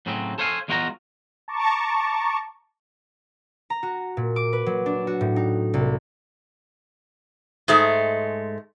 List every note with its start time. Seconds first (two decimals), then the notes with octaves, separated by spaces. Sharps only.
0.06 A2 C#3 F#3 C4
0.38 A4 C5 C#5 F5 G#5
0.68 E2 G#3 F4 F#4 G5 A#5
1.48 A5 A#5 C#6 D6
3.70 A#5
3.83 F#4
4.17 A#2
4.36 D6
4.53 B4
4.66 F#3
4.86 D4
5.07 F#4
5.21 A2
5.36 D#4
5.74 C2
7.68 G#2 G#3 A3